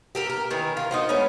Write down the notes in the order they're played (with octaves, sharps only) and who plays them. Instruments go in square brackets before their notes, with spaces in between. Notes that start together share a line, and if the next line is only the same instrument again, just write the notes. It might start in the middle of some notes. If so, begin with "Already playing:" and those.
[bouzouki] G4 A4 A#4
A#4
D#3 E3
F4 A#4
D#4 F#4 C5
G#3 A3 B3 C#4